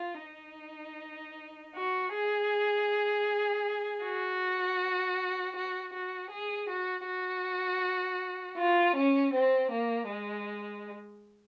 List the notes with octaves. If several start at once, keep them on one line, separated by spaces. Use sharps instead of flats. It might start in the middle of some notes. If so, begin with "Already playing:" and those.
Already playing: F4
D#4
F#4
G#4
F#4
F#4
F#4
G#4
F#4
F#4
F4
C#4
C4
A#3
G#3